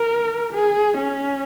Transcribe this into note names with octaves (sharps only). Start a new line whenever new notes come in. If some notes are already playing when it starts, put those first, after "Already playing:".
Already playing: A#4
G#4
C#4